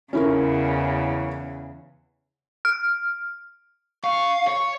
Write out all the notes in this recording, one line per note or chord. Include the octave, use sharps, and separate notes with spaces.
E2 C#3 C#4 E4 A#4
F6
F5 C#6
C#5 C#6